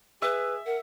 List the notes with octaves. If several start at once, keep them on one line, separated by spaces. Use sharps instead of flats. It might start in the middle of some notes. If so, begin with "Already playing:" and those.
G#4 B4 E5
A#4 F#5